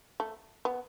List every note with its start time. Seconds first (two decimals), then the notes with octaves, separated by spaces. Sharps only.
0.20 A3
0.65 B3